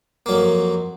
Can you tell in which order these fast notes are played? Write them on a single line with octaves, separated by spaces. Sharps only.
A#3 F#3 F2